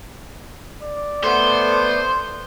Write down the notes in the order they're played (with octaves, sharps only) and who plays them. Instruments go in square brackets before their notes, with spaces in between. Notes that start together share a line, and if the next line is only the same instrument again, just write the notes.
[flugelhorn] D5
[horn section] A3 B3 [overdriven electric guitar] C5